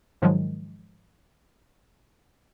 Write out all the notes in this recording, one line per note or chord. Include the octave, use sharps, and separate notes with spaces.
G#2 D#3 F3 F#3 G#3